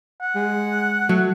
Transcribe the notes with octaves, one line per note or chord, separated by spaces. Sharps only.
F#5
G#3
F#3 A3